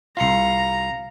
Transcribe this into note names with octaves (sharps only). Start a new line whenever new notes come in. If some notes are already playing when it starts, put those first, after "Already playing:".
C2 F4 F5 A#5 C7 C#7